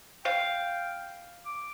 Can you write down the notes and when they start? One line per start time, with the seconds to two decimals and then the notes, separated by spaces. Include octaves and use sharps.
0.25 F5 G5
1.46 D6